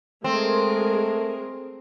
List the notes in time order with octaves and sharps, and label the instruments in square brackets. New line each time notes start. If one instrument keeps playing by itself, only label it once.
[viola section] G#3 G#4 A#4 [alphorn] A3 [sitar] C4